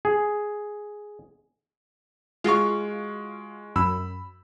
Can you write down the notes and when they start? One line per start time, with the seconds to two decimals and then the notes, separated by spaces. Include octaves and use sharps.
0.05 G#4
2.44 G#3 F4 F#4 F5 C#6
3.76 F#2 B5 E6